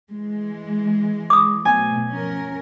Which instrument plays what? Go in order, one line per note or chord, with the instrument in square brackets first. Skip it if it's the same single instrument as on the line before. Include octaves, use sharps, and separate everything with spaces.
[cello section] E3 G#3
[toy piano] D6 D#6
[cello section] B2 F#3 A3 [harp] G#5
[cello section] F3 C#4 A#4